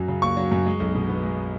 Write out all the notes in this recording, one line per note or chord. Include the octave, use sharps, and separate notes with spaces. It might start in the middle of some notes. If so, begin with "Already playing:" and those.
Already playing: F#2 F#3
C#3
A#3 C#6
F#3
F#2
G#3
B1
B2
B3
G#3